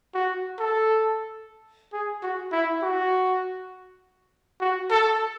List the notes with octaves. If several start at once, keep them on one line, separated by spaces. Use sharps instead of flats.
F#4
A4
G#4
F#4
E4
F#4
F#4
A4